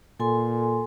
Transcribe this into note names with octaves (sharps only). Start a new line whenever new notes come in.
A#2 A4 G#5 C6